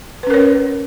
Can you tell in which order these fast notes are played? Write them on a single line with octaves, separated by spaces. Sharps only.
B4 C#4 A#4 C#5